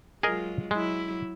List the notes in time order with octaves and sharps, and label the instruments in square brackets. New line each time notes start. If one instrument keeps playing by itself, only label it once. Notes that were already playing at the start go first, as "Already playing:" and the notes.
[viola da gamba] F#3 G#3 F4 [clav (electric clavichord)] G#4 A#4 D#5
[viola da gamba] F#3 E4 [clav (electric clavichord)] G#3